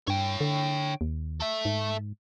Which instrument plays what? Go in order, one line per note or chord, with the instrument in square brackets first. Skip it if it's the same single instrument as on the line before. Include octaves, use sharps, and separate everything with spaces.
[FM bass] G2 [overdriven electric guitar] C#5 G5
[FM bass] D3
D#2
[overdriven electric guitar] A4 E5
[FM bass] G#2